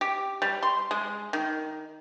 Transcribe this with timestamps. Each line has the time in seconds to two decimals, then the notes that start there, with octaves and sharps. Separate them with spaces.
0.01 G4
0.42 G3
0.63 C6
0.91 G#3
1.33 D#3